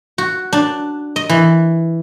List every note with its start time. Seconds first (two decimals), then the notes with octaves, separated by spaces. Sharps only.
0.18 F#4
0.53 D4
1.16 D#5
1.29 E3